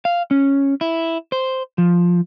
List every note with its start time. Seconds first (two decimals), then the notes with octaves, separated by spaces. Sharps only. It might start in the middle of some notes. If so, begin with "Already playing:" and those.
0.05 F5
0.31 C#4
0.81 E4
1.32 C5
1.78 F3